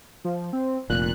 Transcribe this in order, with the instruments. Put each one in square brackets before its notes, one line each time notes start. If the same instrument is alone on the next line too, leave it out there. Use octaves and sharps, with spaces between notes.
[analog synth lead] F3
C4
[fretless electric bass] F1 A#2 [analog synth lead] F#6